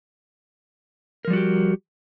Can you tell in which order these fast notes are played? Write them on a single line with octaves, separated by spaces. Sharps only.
A#4 F3 G3 F#4 G4